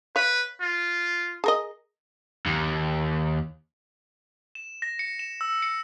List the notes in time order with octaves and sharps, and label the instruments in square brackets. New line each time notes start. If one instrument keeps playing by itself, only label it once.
[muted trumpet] B4 [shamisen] C#5 F5
[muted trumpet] F4
[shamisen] G#4 A#4 D#5
[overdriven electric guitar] D#2
[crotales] E7
A#6
C#7
E7
E6
C#7